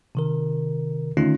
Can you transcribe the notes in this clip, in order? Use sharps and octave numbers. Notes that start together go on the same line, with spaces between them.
C3 D#3 A#4
D3 D#3 A3 C#4 D#4 F4